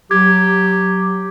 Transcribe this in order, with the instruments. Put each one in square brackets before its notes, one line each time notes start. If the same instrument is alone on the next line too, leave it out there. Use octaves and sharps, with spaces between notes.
[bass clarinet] F#3 [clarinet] G4 [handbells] G#6